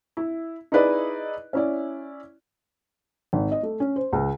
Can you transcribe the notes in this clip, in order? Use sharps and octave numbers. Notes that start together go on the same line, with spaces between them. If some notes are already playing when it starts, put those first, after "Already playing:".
E4
D#4 E4 G#4 B4 D5 D#5
C#4 E4 D5
G#1
D#5
A3
C#4
C5
C#2